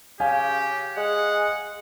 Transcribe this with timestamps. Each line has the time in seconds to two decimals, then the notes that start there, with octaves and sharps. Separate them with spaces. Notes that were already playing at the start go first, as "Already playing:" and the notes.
0.20 C#3 G4 F5 G#5
0.97 G#3 G#4 F#5